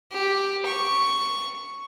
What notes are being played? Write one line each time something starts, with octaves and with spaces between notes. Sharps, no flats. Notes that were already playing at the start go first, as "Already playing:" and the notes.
G4
C#6